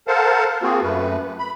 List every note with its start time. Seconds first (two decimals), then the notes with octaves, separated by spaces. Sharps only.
0.08 A4 A#4 C5 F5 F#5 A5
0.63 A#3 C4 F4 F#4 G#4
0.82 F#2 A3 B4
1.39 B5